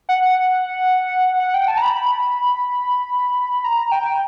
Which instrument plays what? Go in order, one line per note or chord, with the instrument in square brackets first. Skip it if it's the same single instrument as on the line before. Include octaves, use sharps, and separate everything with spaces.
[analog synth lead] F#5
F#5
G5
A5
A#5
B5
B5
A#5
G5